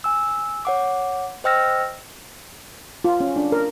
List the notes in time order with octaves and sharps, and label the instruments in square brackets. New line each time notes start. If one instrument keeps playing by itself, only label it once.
[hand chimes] G#5 E6
C#5 F#5 D6
C5 D#5 G5 E6 F6 A#6
[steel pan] F4
C#4
D4
A#4